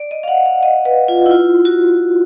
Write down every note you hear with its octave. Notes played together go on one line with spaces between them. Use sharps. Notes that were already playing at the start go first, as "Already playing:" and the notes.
Already playing: D5
D#5
F5
F#5
F5
D#5
B4
F4
E4
F4
F#4